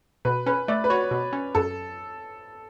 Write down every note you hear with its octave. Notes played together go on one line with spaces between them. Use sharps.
B2 B4
C#4 B4
A3 D5
B4
F#4 C#5
B2
C#4
F#2 A4